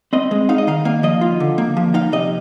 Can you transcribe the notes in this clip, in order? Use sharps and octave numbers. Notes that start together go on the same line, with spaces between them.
C4 D#5
G#3
D#4 F5
D#5
D#3 F5
A#3 F5
F3 D#5
F4
D3
A#3
F3
D#4 F5
C3 D#5